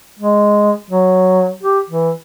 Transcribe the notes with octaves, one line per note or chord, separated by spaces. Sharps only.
G#3
F#3
G4
E3